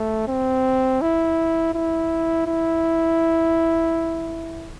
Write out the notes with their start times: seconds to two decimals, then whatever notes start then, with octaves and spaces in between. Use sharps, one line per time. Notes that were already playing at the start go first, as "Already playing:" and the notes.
Already playing: A3
0.28 C4
1.01 E4
1.74 E4
2.47 E4